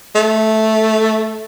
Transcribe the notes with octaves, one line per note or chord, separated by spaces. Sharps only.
A3